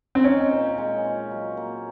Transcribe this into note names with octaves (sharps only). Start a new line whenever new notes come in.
C4
C#4 D#4
A#2
G#3
F4
F#3
A#3